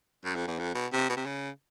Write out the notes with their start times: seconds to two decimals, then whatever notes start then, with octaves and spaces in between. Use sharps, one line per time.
0.25 F#2
0.36 F2
0.48 E2
0.59 F2
0.75 B2
0.93 C3
1.09 B2
1.17 C3
1.26 C#3